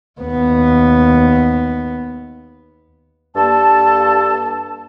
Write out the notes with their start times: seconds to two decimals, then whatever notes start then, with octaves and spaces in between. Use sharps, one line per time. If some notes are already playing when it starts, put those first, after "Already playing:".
0.20 D#2 B3
3.36 G2 A#3 A4 A5